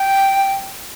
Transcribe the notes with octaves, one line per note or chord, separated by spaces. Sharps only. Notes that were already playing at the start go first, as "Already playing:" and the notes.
Already playing: G5